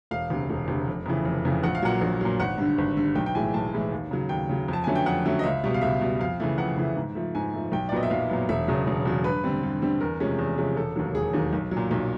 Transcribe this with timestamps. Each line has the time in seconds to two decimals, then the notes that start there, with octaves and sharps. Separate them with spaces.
0.11 E1 F5
0.30 D2 C3
0.50 E1
0.68 D2 C3
0.87 F1
1.06 F2 C#3 E3
1.25 F1
1.45 F2 C#3 E3
1.63 A#1 F#5
1.75 F5
1.83 A#2 F#3 F#5
2.01 A#1
2.21 A#2 F#3
2.39 G#1 F#5
2.58 G2 D3
2.78 G#1
2.97 G2 D3
3.15 B1 G5
3.26 G5
3.35 A2 E3 G#3 G#5
3.54 B1 A5
3.73 A2 E3 G#3
3.91 D#2
4.11 C#3 F#3
4.29 D#2 G5
4.49 C#3 F#3
4.68 F2 A5
4.84 D3 F#3 A3 C#4 G#5
4.95 G5
5.06 F2 F#5
5.25 D3 F#3 A3 C#4
5.39 D#5
5.43 C#2 E5
5.64 B2 G3
5.74 F5
5.81 C#2 E5
6.01 B2 G3
6.20 F2 F5
6.40 C#3 E3 A3
6.58 F2 F#5
6.78 C#3 E3 A3
6.97 G#2
7.15 F3 A3
7.35 G#2 G#5
7.53 F3 A3
7.72 B1 G5
7.89 D5
7.92 A#2 F#3 B3 D#5
8.03 E5
8.10 B1 F5
8.30 A#2 F#3 B3
8.49 E1 E5
8.68 E2 C#3 F#3
8.87 E1
9.05 E2 C#3 F#3
9.24 G2 B4
9.44 D3 G3 C4
9.63 G2
9.82 D3 G3 C4
10.01 E2 A#4
10.20 C3 F3 G#3 C#4
10.38 E2
10.58 C3 F3 G#3 C#4
10.76 E1 A4
10.96 D#2 D#3 F#3
11.15 E1 G#4
11.33 D#2 D#3 F#3
11.53 B1
11.71 F#3
11.77 A#2
11.91 B1